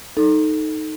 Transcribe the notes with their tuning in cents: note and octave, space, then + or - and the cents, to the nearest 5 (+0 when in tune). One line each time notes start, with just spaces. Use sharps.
D#4 +0 A4 +0